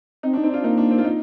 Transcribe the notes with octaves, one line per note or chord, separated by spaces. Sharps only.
C4 D#4
D4
D#4
C4
D4 F4
A#3 D#4
D4
C4
F4
D#4